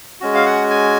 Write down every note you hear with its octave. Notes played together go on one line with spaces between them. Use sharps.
G#3 C#4 F#4
F5
F#5
G#5